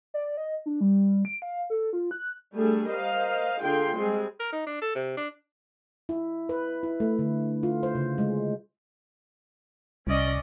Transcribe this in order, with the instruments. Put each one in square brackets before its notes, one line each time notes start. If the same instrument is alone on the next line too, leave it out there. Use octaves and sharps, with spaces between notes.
[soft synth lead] D5
D#5
D4
G3
D7
F5
A4
F4
F#6
[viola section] G3 A3 D4 G#4 A4
A#4 C5 D#5 F5
D3 F4 G#4 G5 C6
G3 G#3 C4 G#4
[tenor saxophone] A#4
D#4
D4
A4
C3
D4
[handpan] E4
B4
E4
A3
D3
F4
C5
C#3
G#3
[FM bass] C2 [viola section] C#4 D5 D#5